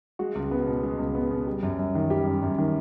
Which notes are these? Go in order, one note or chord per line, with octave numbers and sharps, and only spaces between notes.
G#3 F#4
C#2
B3
B2
G#3 G#4
C#2
B3
B2
G3
F#2
F#2
D#3
G3 G4
F#2
F#2
D#3